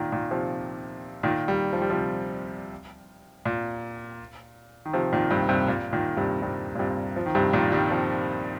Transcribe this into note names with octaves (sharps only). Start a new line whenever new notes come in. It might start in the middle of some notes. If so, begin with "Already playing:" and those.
Already playing: A#2 D#3
A#2 D#3
C3 F3
A#2 D#3
D#3 G3
F3
G3
C3 F3
A#2
D#3
C3 F3
A#2 D#3
G2 C3
G2 C3
A#2
A#2 D#3
G2 C3
G2 C3
A#2
G2 C3
F3
D#3
G2 C3
A#2 D#3
D#3 G3
C3 F3